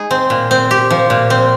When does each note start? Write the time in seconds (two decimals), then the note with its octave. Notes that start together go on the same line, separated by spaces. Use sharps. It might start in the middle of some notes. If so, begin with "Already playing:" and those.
Already playing: G#3 D#4 G#4
0.11 C4
0.30 A#2
0.51 C4
0.71 G4
0.91 F3
1.10 A#2
1.30 C4